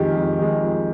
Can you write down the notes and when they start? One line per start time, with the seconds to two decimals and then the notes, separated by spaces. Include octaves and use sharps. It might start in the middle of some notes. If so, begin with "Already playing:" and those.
Already playing: F2 D#3 G#3 G4
0.16 F2
0.38 D#3 G#3
0.62 F2